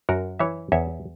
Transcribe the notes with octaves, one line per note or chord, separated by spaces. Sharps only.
F#2 F#4 A#4
E3 C#5 E5
E2 C#5 E5